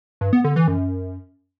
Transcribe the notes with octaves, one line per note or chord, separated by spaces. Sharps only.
G2
B3
D3
E3
F#2